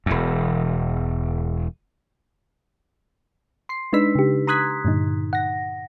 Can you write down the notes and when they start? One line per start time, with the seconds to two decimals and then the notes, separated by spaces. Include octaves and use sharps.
0.06 E1 E2
3.69 C6 C7
3.93 G#3 D4 D#4 B4 E6 B6
4.15 C#3 G4
4.47 A#5 C6 D#6 F#6 G#6 B6
4.85 G2 A#2 D3 D#4
5.33 F#5 A#6